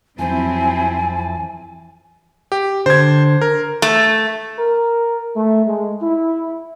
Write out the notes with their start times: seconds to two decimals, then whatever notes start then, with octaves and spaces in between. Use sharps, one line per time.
0.19 F2 E3 F#3 C4 E4 G#5 A5
2.52 G4
2.86 D3 C5 G#6
3.41 A#4
3.82 A3
4.58 A#4
5.36 A3
5.66 G#3
6.01 E4